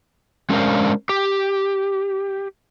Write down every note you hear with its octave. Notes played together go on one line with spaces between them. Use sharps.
G#3 C#4 D4 A#4 C5 F5
G4